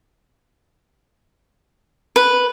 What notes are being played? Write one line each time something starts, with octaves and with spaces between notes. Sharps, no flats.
B4